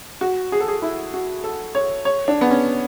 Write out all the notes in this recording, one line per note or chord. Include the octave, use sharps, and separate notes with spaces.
F#4
G#4
A4
G#4
E4
F#4
A4
C#5
C#5
D4
B3
C#4